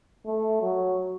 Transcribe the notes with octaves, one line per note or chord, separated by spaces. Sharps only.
A3
F#3